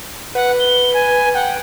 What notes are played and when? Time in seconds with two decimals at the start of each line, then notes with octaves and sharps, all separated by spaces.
0.35 B4 F#5
0.60 G7
0.94 G#5
1.35 F#5 G5